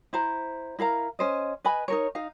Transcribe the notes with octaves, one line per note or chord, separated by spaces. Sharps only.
E4 C5 A#5
E4 A#4 F5 A#5
C#4 C5 D#5
B4 D#5 G#5 B5
D#4 A#4 C#5
D#4 F5